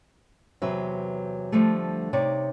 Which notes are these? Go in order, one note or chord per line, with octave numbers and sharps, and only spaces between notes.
E2 C3 F#3 C4 B4 E5
D3 F3 G3 A3
C3 D#4 C#5 D5